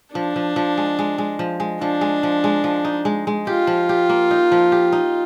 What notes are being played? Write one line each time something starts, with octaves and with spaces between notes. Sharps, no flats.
F3 D4
F3
F3
G#3
G#3
G#3
F3
G#3
F3 D4
G#3
F3
G#3
F3
D#4
G#3
G#3
F4 G4
F3
G4
A#3
D#4
F3
G4
D#4